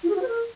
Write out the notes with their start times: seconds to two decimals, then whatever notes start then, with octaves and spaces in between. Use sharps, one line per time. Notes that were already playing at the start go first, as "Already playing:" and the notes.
0.03 F4
0.10 G#4
0.16 F#4
0.22 C5
0.28 A#4